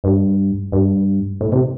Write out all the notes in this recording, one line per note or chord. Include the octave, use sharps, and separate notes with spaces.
G2
G2
A2
C3